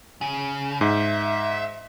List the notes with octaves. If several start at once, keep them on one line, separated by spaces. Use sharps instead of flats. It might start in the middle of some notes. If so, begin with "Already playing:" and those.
C#3
G#2 E5